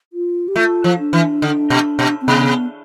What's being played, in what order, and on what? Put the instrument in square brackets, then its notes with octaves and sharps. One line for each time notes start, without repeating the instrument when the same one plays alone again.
[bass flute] F4
G4
[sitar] A3 [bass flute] F4
[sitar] F3
[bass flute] D4
[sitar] E3
D3
B2
B2
[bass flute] C4
[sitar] C3 [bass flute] B3